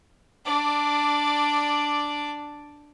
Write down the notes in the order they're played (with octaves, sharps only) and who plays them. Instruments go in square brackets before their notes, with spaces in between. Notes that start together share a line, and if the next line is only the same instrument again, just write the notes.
[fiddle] D4 D5